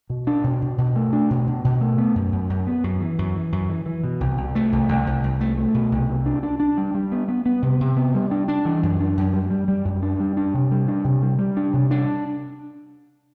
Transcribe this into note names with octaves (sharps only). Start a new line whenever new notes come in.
B2
D4
B2
B2
B2
A3
D4
B2
B2
B2
A3
B3
F#2
F#2
F#2
B3
F#2
E3
F#2
E3
F#2
E3
E3
B2
C2
C2
A3
C2
C2
C2
C2
A3
A3
B2
C2
C3
D4
D4
D4
G3
G3
B3
B3
B3
C3
C3
B3
G3
D4
D4
E3
F#2
D4
F#2
G3
G3
G3
F#2
D4
G3
D4
C3
G3
D4
C3
G3
G3
D4
C3
D4